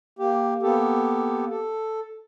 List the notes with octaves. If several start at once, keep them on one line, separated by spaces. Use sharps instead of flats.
A#3 G4
A#3 B3 G4 A4
A4